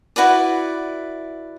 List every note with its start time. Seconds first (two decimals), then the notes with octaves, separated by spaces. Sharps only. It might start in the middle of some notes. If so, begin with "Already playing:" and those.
0.16 E4 F#4 B4 D5